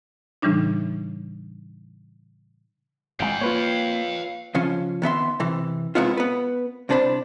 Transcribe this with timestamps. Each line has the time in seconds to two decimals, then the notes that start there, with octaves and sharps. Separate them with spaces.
0.42 A2 C#3 E3 G3 D4 D#4
3.20 G#1 D3 G#3 F5 G5
3.41 A#3 F4 B4 C#5
4.55 C#3 F3 C#4
5.02 D#3 B3 E5 C6
5.40 C3 E3
5.95 C3 G#3 B3 E4 F4
6.17 B3 B4
6.89 C2 C3 D4 C5 B5